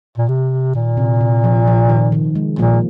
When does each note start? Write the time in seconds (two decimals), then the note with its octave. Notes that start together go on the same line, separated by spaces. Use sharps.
0.18 A#2
0.29 C3
0.75 A#2 D#3
0.97 C3
1.21 C3
1.44 F3
1.67 F3
1.89 D#3
2.12 D#3
2.35 G#3
2.58 A#2 F3 A#3